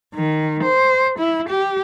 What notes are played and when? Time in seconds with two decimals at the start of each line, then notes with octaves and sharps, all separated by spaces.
0.15 D#3
0.64 C5
1.19 E4
1.49 G4